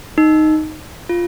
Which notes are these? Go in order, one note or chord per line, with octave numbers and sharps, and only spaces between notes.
D#4
F4